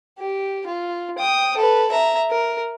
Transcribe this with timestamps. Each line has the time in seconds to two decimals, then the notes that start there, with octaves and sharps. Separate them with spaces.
0.19 G4
0.67 F4
1.18 G5 D#6
1.57 A4 B4
1.91 E5 A#5
2.30 A#4